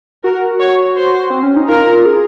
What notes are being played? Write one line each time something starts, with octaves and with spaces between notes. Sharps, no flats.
F#4 A#4
C#5
C5
C4
C#4
D#4
F4 A#4
G#4